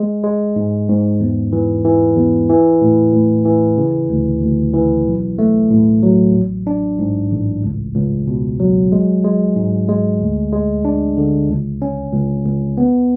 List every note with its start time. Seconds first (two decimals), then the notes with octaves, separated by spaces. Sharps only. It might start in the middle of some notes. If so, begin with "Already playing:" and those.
Already playing: G#3
0.23 G#3
0.56 G#2
0.88 G#2
1.20 E2
1.52 E3
1.84 E3
2.17 E2
2.49 E3
2.81 A2
3.13 A2
3.45 E3
3.78 C#3
4.10 D2
4.42 D2
4.74 E3
5.06 B1
5.39 A3
5.71 A2
6.03 F#3
6.35 A1
6.67 D4
6.99 G#2
7.31 A1
7.63 C#2
7.95 C#2
8.27 B2
8.60 F#3
8.92 G#3
9.24 G#3
9.56 G#2
9.89 G#3
10.20 D2
10.53 G#3
10.85 D4
11.17 D3
11.49 C#2
11.82 C#4
12.13 C#2
12.46 C#2
12.78 B3